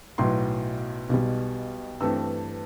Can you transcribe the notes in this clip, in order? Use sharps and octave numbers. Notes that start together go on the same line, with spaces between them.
B1 A2 F#3 B3 C6
B1 B2 G3
G2 E3 A3 C4 E6